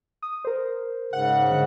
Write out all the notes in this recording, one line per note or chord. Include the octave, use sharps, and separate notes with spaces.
D#6
A#4 C5
G#2 C#3 F#5
D3